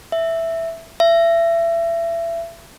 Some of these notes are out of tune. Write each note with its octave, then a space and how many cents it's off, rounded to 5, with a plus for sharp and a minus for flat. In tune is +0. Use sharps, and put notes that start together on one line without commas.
E5 +0
E5 +30